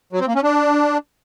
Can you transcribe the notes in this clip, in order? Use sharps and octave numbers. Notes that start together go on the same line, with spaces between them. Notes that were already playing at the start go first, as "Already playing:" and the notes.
F#3
C4
A#3
C#4
D4